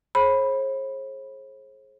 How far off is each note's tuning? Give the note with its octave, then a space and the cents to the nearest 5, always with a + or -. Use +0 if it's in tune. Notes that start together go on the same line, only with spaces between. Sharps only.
G#4 +30 C5 +45 B5 +0